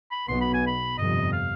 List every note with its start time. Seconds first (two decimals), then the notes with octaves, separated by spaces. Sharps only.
0.11 B5
0.28 B1 B2 B3 C6
0.41 B5
0.54 G#5
0.67 B5
0.98 G1 F2 C3 D#5
1.32 F5